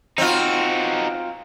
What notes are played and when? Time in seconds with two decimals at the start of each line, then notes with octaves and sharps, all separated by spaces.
0.18 C4 D#4 F4 F#4